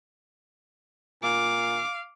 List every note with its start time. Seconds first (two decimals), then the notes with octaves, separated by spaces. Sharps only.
1.23 A#2 F5 D6